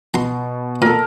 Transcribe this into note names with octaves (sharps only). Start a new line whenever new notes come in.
B2 A#5 C6
A#2 A4 A#4